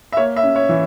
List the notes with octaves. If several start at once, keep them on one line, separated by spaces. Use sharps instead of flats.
E5
A#3 C#5
E5
C#4
C#5
E3